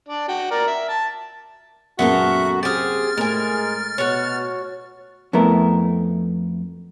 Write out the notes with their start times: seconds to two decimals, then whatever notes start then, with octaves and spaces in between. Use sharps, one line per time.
0.08 D4 D5
0.28 F#4 G5
0.51 A#4 D5
0.67 E5
0.89 A5
1.99 F#2 A#2 G#3 B3 F#4 A4 A#4 E5
2.63 C4 G4 G#4 F6 A6
3.17 A2 G#3 A#4 G#5
3.98 B2 F#4 C#5
5.33 F2 A3 B3 E4 A#4